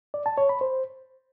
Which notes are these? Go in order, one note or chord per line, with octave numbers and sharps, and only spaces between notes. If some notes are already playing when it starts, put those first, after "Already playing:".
D5
A5
C#5
B5
C5